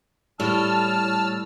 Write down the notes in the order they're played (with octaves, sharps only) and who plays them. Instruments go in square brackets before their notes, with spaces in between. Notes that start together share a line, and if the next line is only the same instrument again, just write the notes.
[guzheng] A2 [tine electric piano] G3 [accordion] A5 E6 F6